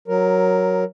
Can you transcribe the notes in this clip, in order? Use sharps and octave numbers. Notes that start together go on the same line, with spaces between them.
F#3 A#4